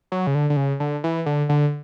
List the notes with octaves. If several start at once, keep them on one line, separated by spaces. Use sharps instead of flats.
F#3
C#3
D3
D3
C#3
D3
E3
D3
D3